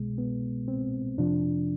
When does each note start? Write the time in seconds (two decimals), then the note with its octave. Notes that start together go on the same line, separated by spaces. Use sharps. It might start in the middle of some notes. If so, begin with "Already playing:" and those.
Already playing: C2 B2 G#3
0.18 B3
0.68 C4
1.17 F2 C3 F3 D4